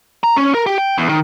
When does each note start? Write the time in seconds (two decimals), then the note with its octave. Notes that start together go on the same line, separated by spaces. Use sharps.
0.24 A#5
0.37 C#4
0.54 A#4
0.67 G4
0.78 G5
0.98 E2
1.09 D#3